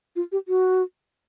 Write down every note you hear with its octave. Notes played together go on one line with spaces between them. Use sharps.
F4
G4
F#4